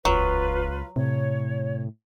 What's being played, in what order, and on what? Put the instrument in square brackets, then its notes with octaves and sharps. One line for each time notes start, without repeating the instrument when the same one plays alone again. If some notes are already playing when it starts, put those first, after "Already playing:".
[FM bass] D#1 [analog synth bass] C#2 [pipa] F#3 [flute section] F4 B4
[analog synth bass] A2 [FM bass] C3 [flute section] C#5